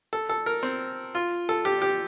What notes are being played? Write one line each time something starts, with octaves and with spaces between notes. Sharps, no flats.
A4
A4
A#4
C4
F4
A4
G4
G4